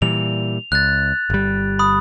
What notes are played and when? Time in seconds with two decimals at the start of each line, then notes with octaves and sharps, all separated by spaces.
0.02 A#2 E3 G3 F7
0.72 C#2 F#6 A6
1.30 G1 G3
1.79 B5 D#6